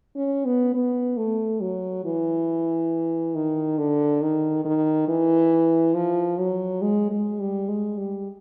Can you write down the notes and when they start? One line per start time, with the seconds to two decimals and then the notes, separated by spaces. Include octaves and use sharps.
0.16 C#4
0.45 B3
0.74 B3
1.17 A3
1.61 F#3
2.05 E3
3.35 D#3
3.78 D3
4.22 D#3
4.65 D#3
5.08 E3
5.95 F3
6.38 F#3
6.82 G#3
7.10 G#3
7.40 G3
7.69 G#3
7.98 G3